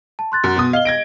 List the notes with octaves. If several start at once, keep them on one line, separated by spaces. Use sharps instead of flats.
A5
C6 F#6 A6
F#2
B2 D#6
D#5 F5 G7
G#6 A#6 D7